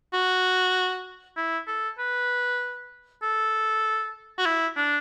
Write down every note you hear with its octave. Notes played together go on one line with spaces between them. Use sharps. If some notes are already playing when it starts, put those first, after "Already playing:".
F#4
E4
A4
B4
A4
F#4
E4
D4